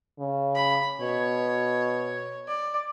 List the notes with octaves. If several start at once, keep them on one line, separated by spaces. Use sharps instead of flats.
C#3
B5
B2 C#5
D5